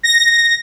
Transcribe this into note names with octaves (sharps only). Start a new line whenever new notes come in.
A#6